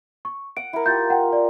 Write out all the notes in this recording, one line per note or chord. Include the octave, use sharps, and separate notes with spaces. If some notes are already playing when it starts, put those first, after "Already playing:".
C#6
F#5 D7
E4 A#4
F4 G4 G6 A6
F#5 G5
D5